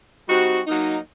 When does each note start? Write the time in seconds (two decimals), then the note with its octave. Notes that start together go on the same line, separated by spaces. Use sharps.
0.29 G3 C4 D#4 F#4
0.67 F#3 A#3 D#4